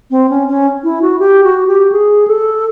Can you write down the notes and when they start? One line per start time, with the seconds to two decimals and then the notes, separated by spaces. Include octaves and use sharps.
0.11 C4
0.29 C#4
0.48 C#4
0.84 E4
1.02 F#4
1.19 G4
1.44 F#4
1.68 G4
1.92 G#4
2.28 A4